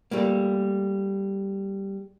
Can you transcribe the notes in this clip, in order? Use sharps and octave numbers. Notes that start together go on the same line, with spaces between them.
G3 A3 A#3